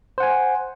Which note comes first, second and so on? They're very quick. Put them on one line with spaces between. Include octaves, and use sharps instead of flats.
C5 F#5 G#5